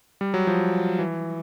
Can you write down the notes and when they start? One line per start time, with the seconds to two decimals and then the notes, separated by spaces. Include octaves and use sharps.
0.21 G3
0.34 F#3
0.47 F3
0.99 E3